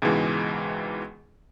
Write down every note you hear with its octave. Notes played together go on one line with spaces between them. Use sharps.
C#2 G#2 B2 E3 G#3